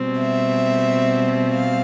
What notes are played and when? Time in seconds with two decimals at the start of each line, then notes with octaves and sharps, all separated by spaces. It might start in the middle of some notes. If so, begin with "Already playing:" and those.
Already playing: B2 G3 C4
0.18 E5
1.52 F5